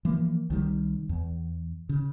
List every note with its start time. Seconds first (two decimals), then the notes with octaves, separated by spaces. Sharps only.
0.05 E3 F3 A#3
0.50 C2 D#3 G3
1.09 E2
1.89 C#3